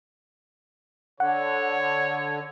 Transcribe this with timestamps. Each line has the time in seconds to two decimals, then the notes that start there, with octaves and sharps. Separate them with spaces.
1.20 D3 C#5 F#5